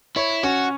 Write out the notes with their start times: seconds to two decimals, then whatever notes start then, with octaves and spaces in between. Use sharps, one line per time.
0.16 E4 C#5
0.43 C#4 F#4